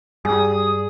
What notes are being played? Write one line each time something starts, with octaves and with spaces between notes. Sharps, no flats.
G2 G3 G#4 D#6